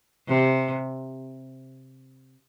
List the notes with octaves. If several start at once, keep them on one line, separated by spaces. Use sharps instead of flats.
C3